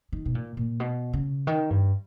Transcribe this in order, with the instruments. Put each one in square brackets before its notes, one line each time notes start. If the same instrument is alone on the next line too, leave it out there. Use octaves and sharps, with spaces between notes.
[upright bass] D#3
B2
A#2
A#2
B2
C#3
D#3
G2